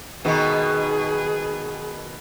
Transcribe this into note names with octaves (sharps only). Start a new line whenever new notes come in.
B2 D#3 B3 G#4